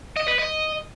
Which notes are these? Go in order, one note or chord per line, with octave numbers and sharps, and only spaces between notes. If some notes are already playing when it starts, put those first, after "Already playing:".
D#5
B4
D#5